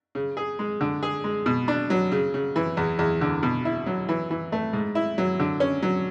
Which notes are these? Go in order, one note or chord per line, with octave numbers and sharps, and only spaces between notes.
C#3
G#4
G#3
D3
G#4
G#3
B2
D4
F#3
C#3
C#3
E3
E2
E2
D3
B2
E4
F#3
E3
E3
A3
G#2
E4
F#3
D3
C#4
F#3